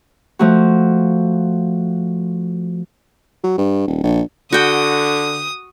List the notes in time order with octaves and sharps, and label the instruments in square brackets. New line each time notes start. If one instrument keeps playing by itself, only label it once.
[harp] F3 A3 F#4
[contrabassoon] F#3
G2
D#1
A#1
[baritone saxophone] D3 [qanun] F#4 G5 [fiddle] D#6